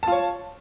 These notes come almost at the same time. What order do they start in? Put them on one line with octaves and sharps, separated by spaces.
A5 F4 C#5